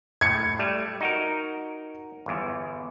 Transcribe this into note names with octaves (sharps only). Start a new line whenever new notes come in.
A2 G#6 C#7
G3 A3
D#4 F#4 A#4
G1 E2